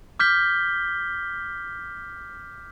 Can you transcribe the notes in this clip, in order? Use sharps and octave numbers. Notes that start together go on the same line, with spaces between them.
D6 F6 G6 B6 G7